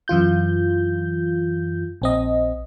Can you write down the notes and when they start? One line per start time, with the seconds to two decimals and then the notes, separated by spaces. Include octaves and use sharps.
0.08 F#2 E3 F4 G6
2.02 A#1 C4 D#5